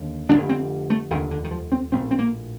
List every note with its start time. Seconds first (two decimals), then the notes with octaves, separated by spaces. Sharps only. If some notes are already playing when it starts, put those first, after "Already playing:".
Already playing: F1 D#2 D3
0.29 D#2 D3 D4
0.34 F1
0.49 C4
0.90 A3
1.10 F1 D#2 D3 D#3
1.31 D3
1.44 D#3
1.51 F3
1.72 C4
1.92 A#1 A2 C4
2.11 C4
2.19 A#3